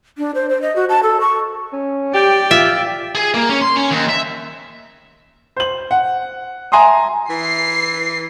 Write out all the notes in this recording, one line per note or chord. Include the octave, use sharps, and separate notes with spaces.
D4
C5
C5
D#5
F#4
A5
A4
C#6
C#4
G4 D5 G5
F4 E5
G#4
A#3
C#4
C6
C#4
D#2
E5
C5 F#7
F#5
E5 G#5 A#5 C6 D#6
E3 C7